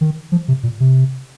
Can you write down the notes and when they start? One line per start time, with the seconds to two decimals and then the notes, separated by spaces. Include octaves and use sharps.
0.01 D#3
0.32 F3
0.48 C3
0.63 A#2
0.80 C3